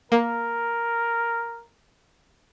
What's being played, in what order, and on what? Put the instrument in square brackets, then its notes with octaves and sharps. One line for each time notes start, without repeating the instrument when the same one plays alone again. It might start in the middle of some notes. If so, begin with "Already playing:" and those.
[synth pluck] A#3 [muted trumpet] A#4